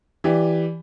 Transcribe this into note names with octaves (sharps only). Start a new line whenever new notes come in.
E3 G4 D5